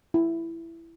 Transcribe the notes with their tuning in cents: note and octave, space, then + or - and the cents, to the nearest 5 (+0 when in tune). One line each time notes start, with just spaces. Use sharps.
E4 +10